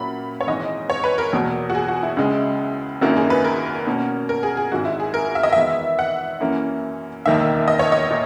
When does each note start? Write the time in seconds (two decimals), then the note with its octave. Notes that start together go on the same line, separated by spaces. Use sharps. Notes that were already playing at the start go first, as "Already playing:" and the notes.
Already playing: A#2 F#3 A#3 C#4 E4 B5
0.41 C#5
0.47 G#1 G#2 E3 G#3 D#4 D#5
0.90 C#5
1.04 B4
1.18 A#4
1.33 E2 B2 F#3 A#3
1.70 F#4
1.75 G#4
1.88 F#4
2.03 E4
2.17 C#2 C#3 G#3
3.01 G#1 F#2 D#3 A#3 E4 F#4
3.17 G#4
3.30 B4
3.45 A#4
3.87 B2 A#3 C#4
4.29 A#4
4.43 G#4
4.57 G#4
4.71 G#1 G#2 D#3 F#4
4.85 E4
5.00 G#4
5.14 A#4
5.35 E5
5.43 D#5
5.53 E2 D#3 G#3 B3 E5
5.99 F#5
6.40 F#2 E3 A#3 C#4 E4
7.26 E1 D#2 D#3 A#3 D#4 E5
7.68 D#5
7.79 C#5
7.92 D#5
8.10 A#2